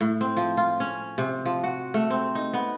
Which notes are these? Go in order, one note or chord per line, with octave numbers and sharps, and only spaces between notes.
A2
C4
F3
F4
C#4
C3
F3
F#4
A3
C4
D#4
B3